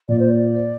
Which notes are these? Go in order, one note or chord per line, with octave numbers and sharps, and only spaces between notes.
A#2 D5
C5
D5